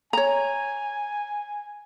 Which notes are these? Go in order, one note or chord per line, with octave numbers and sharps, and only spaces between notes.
C#5 G#5 A#5